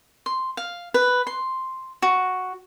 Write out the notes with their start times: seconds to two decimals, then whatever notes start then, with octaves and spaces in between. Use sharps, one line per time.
0.26 C6
0.57 F5
0.94 B4
1.27 C6
2.02 F#4